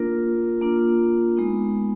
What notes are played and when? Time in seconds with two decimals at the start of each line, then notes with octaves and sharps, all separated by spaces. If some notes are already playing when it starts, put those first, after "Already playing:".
Already playing: A#3 D4 F4 A#4
0.61 A#3 D4 F4
1.37 G#3 B3 D#4